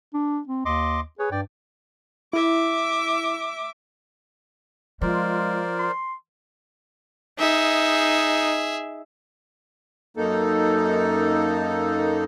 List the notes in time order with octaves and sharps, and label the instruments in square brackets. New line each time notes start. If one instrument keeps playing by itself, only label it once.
[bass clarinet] D4
C4
[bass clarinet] D#2 [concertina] D#5 C6 D6
[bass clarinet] G#4 [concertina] B4 C#5
[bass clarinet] G2 [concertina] D5 G5
[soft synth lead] E4 [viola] E5 D6
[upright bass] F3 [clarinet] G#3 [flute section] F4 [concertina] A#4 C5 D5
[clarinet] C6
[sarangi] D#4 [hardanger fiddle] G#4 E5
[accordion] F#2 A#3 D#4 A4